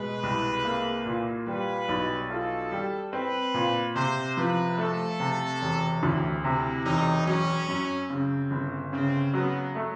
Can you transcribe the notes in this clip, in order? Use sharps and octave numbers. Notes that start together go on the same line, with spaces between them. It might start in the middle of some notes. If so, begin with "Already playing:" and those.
Already playing: B2 G#3 B4
C2
A#3
A#2
G3 B4
B1
F4 A4
G3
C4 B4
A#2
C3 C5
F3 B4
A3 A4
C3
E1
D2
C3 E4
E1 D#4
F#3 C#4
F#2
C#3 C4
G1
C#3 C4
F#3 B3
A3